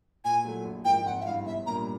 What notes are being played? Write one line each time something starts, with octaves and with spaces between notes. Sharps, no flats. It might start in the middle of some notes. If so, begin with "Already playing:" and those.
A#2 G#5
F#3 A3
A#1
G#2 F3 A#3 G5
G#1 F#5
E5
G2 E3 F5
B1 E5
A#2 G3 A#3 D4 A#5